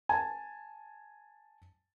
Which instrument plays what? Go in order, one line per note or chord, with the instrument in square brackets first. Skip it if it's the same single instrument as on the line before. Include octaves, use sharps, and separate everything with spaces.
[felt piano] G#5 A5